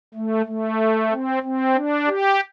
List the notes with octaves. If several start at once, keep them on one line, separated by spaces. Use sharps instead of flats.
A3
A3
C4
C4
D4
G4